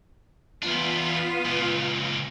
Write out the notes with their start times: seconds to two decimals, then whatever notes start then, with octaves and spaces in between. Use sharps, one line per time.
0.63 E2 B3 D4 F4
1.45 C#2 A#2